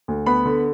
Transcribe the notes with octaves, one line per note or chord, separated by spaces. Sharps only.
D2
B3 B5
D3